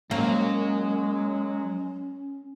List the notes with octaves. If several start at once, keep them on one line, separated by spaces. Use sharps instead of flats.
F#3 G#3 A#3 C#4 C#5